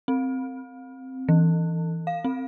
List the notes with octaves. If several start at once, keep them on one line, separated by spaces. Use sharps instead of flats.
C4
E3
F5
C4